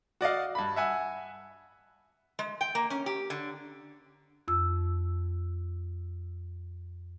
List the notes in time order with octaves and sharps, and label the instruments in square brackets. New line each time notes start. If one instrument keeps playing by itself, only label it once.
[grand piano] F#4 D5 D#5 F5
G2 B5
E5 F#5 G#5 E6
[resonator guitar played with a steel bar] G#3
G5
A#3
C#4
G4
D3
[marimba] F2 E6